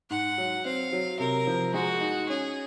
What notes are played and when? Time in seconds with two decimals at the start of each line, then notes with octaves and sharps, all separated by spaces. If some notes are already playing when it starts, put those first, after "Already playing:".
0.10 G#2 F#5
0.38 F#3
0.65 C4 F5
0.93 F#3
1.19 C3 A#4
1.47 F3
1.74 G#3 F#4
2.01 D#4
2.29 C#4 G#4